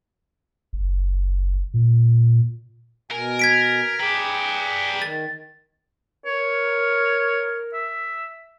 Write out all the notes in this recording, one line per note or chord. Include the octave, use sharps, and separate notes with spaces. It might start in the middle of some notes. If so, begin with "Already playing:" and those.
F#1
A#2
B2 A#4 G#5
G#6 B6 D7
G#4 B4 D5 G5 A#5
D#3 A6
A#4 C#5
E5